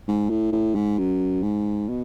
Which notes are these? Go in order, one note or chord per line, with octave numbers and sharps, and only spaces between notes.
G#2
A2
A2
G#2
F#2
G#2
B2